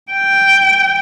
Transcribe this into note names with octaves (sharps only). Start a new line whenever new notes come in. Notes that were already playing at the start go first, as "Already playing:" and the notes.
G5